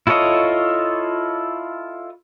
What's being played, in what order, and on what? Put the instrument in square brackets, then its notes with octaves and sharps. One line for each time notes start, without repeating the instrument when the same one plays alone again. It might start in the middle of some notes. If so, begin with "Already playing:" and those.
[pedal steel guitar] E4 F4 A4 C#5 D#5